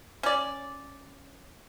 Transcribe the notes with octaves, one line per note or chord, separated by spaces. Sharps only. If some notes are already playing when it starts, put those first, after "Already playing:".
C#4 D5